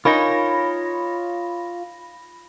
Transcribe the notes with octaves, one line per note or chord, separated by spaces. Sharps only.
D#4 F4 A#4 C#5 G#5 B5 A#6